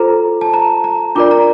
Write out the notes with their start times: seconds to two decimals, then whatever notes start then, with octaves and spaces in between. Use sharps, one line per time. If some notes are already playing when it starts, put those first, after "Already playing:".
Already playing: F4 A4 C5 A#5
0.41 A5
0.54 A#5
0.84 A#5
1.15 D4 F4 A#4 D5 D6
1.31 A#5